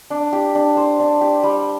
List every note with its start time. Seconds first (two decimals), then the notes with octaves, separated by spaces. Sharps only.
0.10 D4
0.33 G4
0.55 D4
0.77 C5
1.00 D4
1.21 G4
1.43 G3